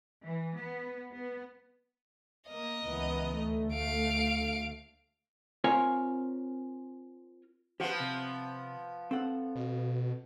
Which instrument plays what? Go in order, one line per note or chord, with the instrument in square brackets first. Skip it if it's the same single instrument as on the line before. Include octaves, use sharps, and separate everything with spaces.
[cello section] E3
B3
B3
[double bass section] A#3 [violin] A#4 D#5
[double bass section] C#2 E3 B3
D2 A3
[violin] F5 D7
[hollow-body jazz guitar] C4 F4 A#4 C#5 G#5
[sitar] F3 B3 [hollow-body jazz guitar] G4 F#5
[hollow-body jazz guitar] C3
C4 A4 F#5
[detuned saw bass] B2